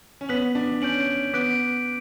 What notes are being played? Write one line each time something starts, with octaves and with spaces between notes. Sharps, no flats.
C#4
B3 F#6 B6 F#7
D4
C#4 G6 D7 F#7
B3 D6 F#6 B6 D7